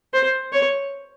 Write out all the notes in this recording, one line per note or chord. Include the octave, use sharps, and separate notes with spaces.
C5
C#5